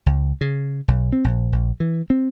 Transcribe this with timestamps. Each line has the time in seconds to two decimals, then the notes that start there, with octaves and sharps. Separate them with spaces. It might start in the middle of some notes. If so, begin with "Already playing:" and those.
0.06 C#2
0.41 C#3
0.88 B1
1.12 C4
1.24 A#1
1.52 A#1
1.80 E3
2.10 C4